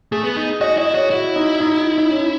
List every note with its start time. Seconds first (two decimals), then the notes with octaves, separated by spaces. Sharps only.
0.12 A3 G#4
0.24 B3
0.37 D#4
0.61 F#4 D#5
0.77 E4 D#5
0.94 F#4 C#5
1.10 E4 F#4
1.36 D#4
1.60 D#4
1.98 D#4
2.09 C#4